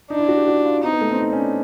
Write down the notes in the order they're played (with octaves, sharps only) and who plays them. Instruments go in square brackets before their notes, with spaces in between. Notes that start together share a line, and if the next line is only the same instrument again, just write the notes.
[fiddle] D4 [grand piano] D#4
[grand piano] E4
F#4
G4
F#4
F4
[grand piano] C4 [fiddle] D#4
[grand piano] B3
A3
C4
D#4
C#4
D4